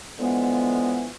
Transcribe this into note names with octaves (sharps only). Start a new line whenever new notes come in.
D3 E3 F3 G#3 B3